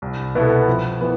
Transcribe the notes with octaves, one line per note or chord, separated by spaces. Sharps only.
C2
B2 B3 E4 A4
F2
E3 B3